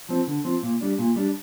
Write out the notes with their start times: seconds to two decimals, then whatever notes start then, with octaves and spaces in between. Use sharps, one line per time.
0.09 F3 C4
0.27 D3
0.44 F3 C4
0.63 A#2
0.81 G3 D4
0.98 A#2
1.16 G3 D4